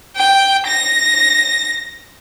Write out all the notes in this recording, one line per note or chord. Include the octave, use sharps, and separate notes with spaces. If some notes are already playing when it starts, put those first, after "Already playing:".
G5
A#6